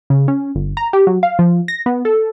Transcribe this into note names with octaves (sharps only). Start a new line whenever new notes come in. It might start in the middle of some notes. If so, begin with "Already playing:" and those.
C#3
C#4
G1
A#5
G4
F#3
F5
F3
A#6
B3
A4